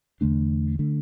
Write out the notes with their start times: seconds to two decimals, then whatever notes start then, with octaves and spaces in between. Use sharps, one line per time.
0.21 E2 D3 A3 D4
0.79 D3 A3